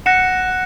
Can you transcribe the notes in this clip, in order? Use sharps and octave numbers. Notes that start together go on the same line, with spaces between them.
F#5 F#6 A#6 C#7 E7